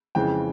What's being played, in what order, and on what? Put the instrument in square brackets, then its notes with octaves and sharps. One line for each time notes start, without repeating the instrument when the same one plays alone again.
[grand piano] F2 C#3 E3 G#3 G5